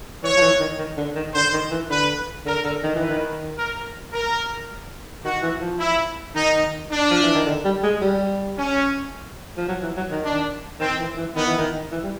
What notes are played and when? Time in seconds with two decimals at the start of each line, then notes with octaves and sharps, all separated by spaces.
0.23 E3 C#5
0.37 F3
0.41 E3
0.60 D#3
0.79 D#3
0.98 D3
1.16 D#3
1.34 D3 C5
1.53 D#3
1.71 E3
1.90 D3 B4
2.46 D3 A#4
2.64 D3
2.83 D#3
2.96 E3
3.01 B4
3.09 D#3
3.57 A#4
4.12 A#4
5.24 D#3 F#4
5.42 E3
5.61 F3
5.79 E4
6.35 D#3 D#4
6.90 D4
7.10 F3
7.23 E3
7.34 D#3
7.46 D3
7.65 G3
7.83 G#3
8.02 G3
8.58 C#4
9.57 F3
9.69 F#3
9.83 E3
9.97 F#3
10.10 D#3
10.25 D4
10.80 D#3 C4
10.99 E3
11.17 E3
11.36 D#3 B3
11.47 E3
11.58 D#3
11.92 E3
12.04 G3